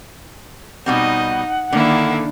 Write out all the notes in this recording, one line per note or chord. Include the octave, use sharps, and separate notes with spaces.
B2 G3 C4 D#4 D#5 F#5
D3 D#3 A#3 D4 E4